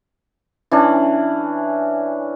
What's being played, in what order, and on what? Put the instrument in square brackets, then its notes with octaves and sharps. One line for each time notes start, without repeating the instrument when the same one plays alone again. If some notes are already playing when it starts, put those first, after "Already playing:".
[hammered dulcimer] E3 C#4 D4